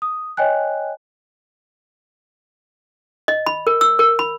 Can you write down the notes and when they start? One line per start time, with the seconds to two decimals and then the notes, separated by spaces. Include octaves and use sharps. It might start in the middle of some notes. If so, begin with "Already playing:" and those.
0.02 D#6
0.37 C#5 D#5 G5 G#5 F#6
3.28 D#5
3.46 B5
3.67 A#4
3.81 E6
3.99 A#4
4.19 B5